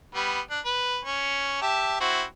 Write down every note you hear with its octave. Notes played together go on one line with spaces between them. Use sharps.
G3 B3
D4
B4
C#4
G4 E5 A5
C4 E4 F#4